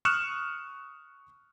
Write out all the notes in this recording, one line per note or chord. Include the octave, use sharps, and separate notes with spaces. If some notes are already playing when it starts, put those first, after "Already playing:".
C#6 D#6 F6 F#6 C#7 E7